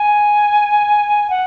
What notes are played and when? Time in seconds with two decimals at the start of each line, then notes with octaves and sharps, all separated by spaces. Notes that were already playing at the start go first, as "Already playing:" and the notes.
Already playing: G#5
1.30 F#5